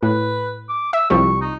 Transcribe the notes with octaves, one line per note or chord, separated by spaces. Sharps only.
A2 B4
D6
E5 E6
C2 F3 G3 C#6
D#4